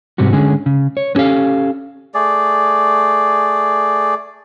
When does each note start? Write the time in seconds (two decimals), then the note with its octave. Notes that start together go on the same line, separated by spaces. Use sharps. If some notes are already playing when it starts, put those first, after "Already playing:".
0.18 G#2 C3 G3 F#4
0.33 D3 G#3 C#4 G#4
0.66 C#3
0.97 C#5
1.15 B3 C#4 G4 A4 F5
2.14 A3 G#4 D5